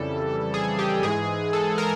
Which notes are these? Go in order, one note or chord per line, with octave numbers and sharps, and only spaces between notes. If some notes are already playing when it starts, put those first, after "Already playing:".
Already playing: F2 C#3 E3 G3 A4
G#4
G4
G#2 E3 G#3 G#4
A4
A#4